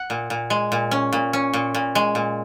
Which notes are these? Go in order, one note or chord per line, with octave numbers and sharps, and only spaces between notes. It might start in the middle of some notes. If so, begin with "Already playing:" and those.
Already playing: F#5
A#2
A#2
G#3
A#2
C#4
A#2
C#4
A#2
A#2
G#3
A#2